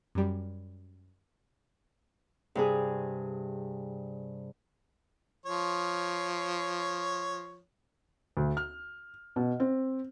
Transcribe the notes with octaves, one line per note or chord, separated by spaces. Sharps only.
F#2 G3
G2 C3 G#4
F3 C#5
D2
F6
B2
C4